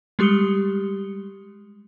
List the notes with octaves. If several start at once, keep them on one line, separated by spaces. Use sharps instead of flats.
G3 G#3 G4 D#6 C#7 G7